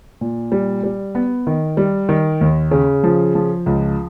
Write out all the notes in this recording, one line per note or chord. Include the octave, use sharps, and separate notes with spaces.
A#2
G3
G3
B3
D#3
G3
D#3
D#2
C#3
F3
F3
C#2